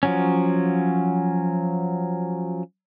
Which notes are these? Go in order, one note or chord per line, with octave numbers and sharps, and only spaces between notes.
F3 F#3 C#4